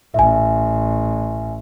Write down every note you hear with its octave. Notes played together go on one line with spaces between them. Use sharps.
A1 E5 G#5